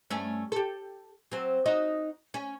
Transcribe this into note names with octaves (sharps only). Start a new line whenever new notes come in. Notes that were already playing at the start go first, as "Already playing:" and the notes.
G2 A3 C#4
G4 A4
F#3 C4
D#4 F#4 D#5
C#4